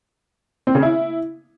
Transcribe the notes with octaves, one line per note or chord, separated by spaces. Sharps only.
C4
C#3
E4